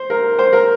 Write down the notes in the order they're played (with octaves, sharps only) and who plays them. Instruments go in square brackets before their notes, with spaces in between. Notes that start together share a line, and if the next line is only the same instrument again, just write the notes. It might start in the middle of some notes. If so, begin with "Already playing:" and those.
Already playing: [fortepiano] C5
A#4
C5
A#4